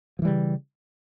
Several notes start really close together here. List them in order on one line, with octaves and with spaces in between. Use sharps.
F3 E3 G3 C#3